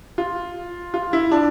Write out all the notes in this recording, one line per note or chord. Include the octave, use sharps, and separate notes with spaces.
F4
F4
E4
D4